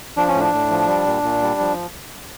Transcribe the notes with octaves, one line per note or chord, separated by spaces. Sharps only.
F3 D4
C#4
A2
D4
A2
F3
G3
A#2
A#2
G3
F3